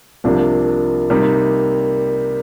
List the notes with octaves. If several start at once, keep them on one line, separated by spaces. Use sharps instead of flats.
C2 C3 F3 A#3 D4
C3 G3 A#3 D#4